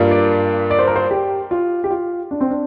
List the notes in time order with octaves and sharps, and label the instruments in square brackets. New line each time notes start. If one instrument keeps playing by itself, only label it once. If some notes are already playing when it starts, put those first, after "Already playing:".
Already playing: [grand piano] G2 G3 A#3 F4
[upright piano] D5
D5
C5
A#4
C5
G4
F4
G4
F4
D4
C4
D4